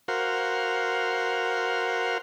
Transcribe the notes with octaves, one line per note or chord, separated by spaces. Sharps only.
F#4 A#4 C5 F5